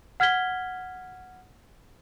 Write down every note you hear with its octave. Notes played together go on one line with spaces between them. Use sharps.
F#5 F6 G#6 B6 G7